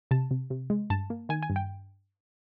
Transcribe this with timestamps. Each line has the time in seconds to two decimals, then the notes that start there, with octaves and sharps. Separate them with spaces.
0.11 C3 A5
0.31 C3
0.50 C3
0.70 G#3
0.90 G2 A5
1.10 A#3
1.29 D#3 G#5
1.43 G#5
1.50 G2
1.56 G5